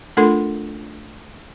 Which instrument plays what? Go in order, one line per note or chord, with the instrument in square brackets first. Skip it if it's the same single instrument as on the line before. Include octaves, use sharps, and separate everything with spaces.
[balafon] A3 D4 F4 A4 A#4 C6